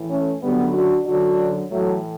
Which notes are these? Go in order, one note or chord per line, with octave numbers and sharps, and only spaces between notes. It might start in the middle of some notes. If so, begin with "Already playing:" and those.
Already playing: A2 E3
A3 C#4
F#2 D3 F#3 G3 B3
D4 F#4
F#2 D3 F#3 D4 F#4
A2 E3 F#3 A3